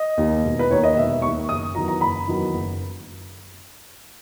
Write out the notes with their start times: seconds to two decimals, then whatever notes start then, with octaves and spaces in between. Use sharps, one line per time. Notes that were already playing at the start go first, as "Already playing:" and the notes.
Already playing: D#5
0.17 D#2 D#3
0.44 E1
0.59 B4
0.70 D#2 D#3 C#5
0.84 D#5
0.96 E1 E5
1.22 D#2 D#3 C#6
1.48 F#1 D#6
1.75 E2 D#3 F#3 A#5
1.88 A#5
2.01 F#1 B5
2.27 E2 D#3 F#3
2.54 F#1